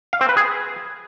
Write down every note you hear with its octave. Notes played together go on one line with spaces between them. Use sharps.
F5
C4
B4
G#4